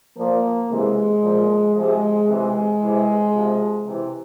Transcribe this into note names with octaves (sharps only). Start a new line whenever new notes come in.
A#2 F3 A#3
C3 E3 G#3
A#2 F3
C3 F3 G#3
C3 E3 G#3
C3 E3
C3 F3
C3 E3